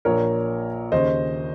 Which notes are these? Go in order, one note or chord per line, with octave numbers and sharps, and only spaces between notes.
A#1 A#2 A#4 C#5
D#2 C#3 C5 D#5